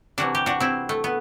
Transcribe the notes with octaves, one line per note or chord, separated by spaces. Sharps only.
C3 E3 G3 D4 F#4
G4
D4 F#4
C4 E4
A3
B3